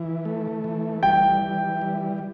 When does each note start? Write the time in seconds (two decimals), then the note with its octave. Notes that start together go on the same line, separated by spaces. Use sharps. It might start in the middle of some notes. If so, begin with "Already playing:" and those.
Already playing: E3
0.25 A3
0.64 E3
1.03 G3 G5
1.42 E3
1.82 G3